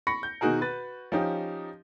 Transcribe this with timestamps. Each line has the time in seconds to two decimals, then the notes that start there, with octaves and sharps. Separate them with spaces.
0.07 B5 C#6 A#6 C#7
0.23 G6
0.41 B2 D#3 D#4 F#4 G#4 A#4
0.61 F#4 B4 A6
1.12 F3 C#4 D#4 G4